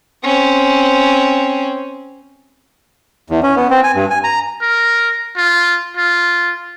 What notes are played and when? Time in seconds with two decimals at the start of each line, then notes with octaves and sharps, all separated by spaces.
0.24 C4 C#4
3.30 E2
3.43 C#4
3.56 B3
3.70 C4
3.84 G#5
3.95 G2
4.10 G#5
4.24 A#5
4.61 A#4
5.37 F4
5.97 F4